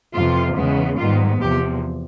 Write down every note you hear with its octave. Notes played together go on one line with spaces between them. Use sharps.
F2 C3 E3 F4
E2 C#3 E3 G#3 B3
G#2 D#3 G3 B3 F4
E2 C3 F3 G4